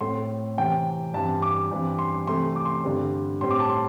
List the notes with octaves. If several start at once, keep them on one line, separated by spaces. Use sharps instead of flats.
A2 A3 C4 C6
C3 E3 C4 G5
G2 E3 C4 A5
D6
G2 E3 C4
C6
C3 E3 A3 C4 C6
D6
C6
G2 D3 G3 C4
A2 G3 C4 C6
D6
A5
C6